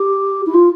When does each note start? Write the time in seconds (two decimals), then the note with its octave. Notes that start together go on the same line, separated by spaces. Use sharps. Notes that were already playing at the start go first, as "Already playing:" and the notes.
Already playing: G4
0.46 E4
0.54 F4